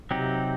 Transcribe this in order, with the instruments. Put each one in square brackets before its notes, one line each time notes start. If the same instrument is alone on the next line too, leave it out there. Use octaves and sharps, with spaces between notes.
[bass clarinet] C3 [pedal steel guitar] F#3 C4 D#4 G4